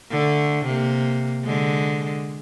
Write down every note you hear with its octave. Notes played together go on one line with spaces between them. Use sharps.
D3 A3
C3 A#3
D3 G#3